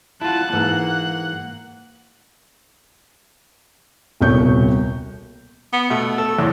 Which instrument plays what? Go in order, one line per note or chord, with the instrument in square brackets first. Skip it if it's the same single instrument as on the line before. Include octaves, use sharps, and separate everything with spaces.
[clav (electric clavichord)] E4 F4 [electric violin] F#5 F#6 [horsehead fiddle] A5
[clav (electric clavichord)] G#2 E3 [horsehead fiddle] A#3
[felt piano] D#1 C2 B2 C#5 C#6 G6
[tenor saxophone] B3
[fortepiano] B2 [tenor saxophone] A3
[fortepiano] A4
[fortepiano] E2 A2 [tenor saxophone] G#3